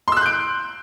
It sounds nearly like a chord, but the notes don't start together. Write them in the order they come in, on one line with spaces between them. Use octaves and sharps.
C6 E6 F#6 G6 D7